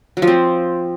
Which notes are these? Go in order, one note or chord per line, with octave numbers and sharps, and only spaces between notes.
F#3
F3
C4